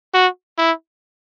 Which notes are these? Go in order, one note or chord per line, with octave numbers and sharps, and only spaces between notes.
F#4
E4